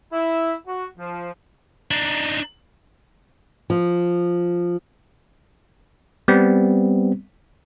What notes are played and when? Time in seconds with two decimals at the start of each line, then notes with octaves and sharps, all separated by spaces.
0.13 E4
0.67 F#4
0.98 F3
1.91 D4 D#4
3.70 F3
6.28 G3 B3 C4